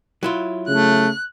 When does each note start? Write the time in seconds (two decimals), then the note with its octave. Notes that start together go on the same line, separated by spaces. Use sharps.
0.23 F#3 E4 F4
0.68 C#3 A3 F#6